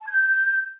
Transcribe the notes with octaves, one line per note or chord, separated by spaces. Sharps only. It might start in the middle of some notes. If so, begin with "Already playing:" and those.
A5
G#6
G6